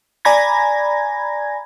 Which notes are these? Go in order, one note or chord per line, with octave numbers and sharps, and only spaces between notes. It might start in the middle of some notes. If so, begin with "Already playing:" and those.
D5 G#5 A#5 B5 G#6 A#6